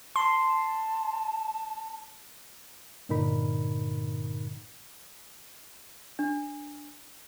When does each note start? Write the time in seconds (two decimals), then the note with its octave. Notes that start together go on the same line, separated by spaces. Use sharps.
0.16 A5 C6
3.09 G2 A#2 D3 D#4 A#4 B5
6.19 D4